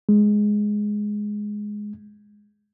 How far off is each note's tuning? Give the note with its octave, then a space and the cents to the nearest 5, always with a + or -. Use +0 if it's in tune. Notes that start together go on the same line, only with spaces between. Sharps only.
G#3 +5